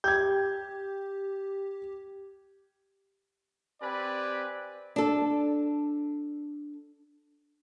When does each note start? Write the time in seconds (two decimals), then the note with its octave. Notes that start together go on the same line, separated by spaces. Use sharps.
0.04 G4 G6 G#6
3.82 C4 G4 B4 D5 G#5 B5
4.96 D4 A4